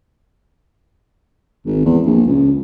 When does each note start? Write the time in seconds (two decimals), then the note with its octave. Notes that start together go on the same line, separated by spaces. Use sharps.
1.66 G#1
1.85 E2
2.05 A#1
2.26 C#2